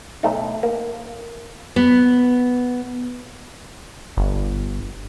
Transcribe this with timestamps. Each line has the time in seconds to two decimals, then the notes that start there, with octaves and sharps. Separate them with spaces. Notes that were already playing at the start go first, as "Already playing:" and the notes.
0.23 B1 A3 D#4
0.63 A#3
1.76 B3
4.17 G1